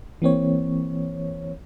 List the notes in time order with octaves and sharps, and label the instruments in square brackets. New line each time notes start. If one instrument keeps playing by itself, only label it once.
[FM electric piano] E3 A#3 C4 C#5